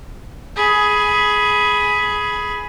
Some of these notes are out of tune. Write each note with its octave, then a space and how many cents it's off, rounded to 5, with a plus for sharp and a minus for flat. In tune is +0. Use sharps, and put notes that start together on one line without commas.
G#4 +10 B5 +0